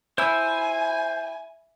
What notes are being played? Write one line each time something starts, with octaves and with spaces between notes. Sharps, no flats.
E4 C5 G#5 E6